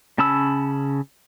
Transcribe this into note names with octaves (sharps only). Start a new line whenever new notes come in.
C#3 C#4 A5 B5 E6